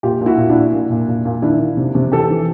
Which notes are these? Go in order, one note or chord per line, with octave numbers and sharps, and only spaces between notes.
A#2 F4 G4
A#2
E4 F#4
A#2
D4 E4
A#2
A#2
A#2
A#2
A#2
D#3 D4 E4
D#3
C3
C3
E3 G4 A4
E3